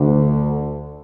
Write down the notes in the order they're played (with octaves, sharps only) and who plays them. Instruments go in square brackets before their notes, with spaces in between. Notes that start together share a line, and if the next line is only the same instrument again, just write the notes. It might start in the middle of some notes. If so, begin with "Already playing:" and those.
Already playing: [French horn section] D2 D3